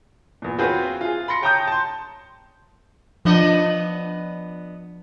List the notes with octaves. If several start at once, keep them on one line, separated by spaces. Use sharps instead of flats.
E2 A#2
C4 F4 F#4 G#4 B4 C#5
F4 G#4
B5 C6 A#6 C#7
C#5 G5 A5 A#5 D#6 G6
A5 C6
F3 B3 D4 D#5